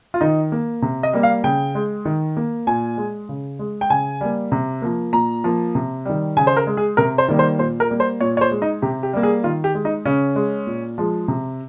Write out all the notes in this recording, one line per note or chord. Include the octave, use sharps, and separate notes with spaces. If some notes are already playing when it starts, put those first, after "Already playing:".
F4
D#3 D#4
A#3
C3
D#5
G3 A#3
F5
C#3 G5
G#3
D#3
A#3
A#2 G#5
G#3
C#3
G#3
G5
C#3 G#5
G3 A#3
C3
F3 A#3
A#2 A#5
F3 A#3
C3
D#3 G3
C#3 G#5
C5
A#4
G#3
G#4
C3 A#4
C5
D#3 G3 A#3
C5
A#2 C5
A#4
G3 A#3
C5
A#2 C#5
C#5
C5
G#3
D#4
C3 G4
G4
G3 A#3
G#4
D#3 F4
G4
G#3
D#4
C#3 C#4
G#3
A#2
F3 G#3
C3